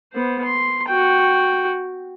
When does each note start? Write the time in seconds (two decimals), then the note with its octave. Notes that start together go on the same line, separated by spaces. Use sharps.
0.13 B3 C5
0.45 C6
0.88 F#4 G5